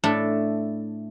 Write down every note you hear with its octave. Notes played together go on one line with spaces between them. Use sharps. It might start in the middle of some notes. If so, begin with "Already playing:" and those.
A2 A3 D4 A4